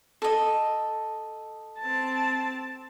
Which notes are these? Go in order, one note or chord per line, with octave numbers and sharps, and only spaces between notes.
A4 D#5
C4 A5